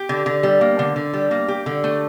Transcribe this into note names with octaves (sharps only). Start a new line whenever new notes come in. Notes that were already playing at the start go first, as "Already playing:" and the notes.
Already playing: G4
D3
D3
G3
A#3
D3
D3
G3
A#3
G4
D3
A3